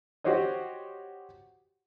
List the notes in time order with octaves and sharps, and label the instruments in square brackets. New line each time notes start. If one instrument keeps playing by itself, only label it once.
[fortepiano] F#4 G4 C5 C#5 D#5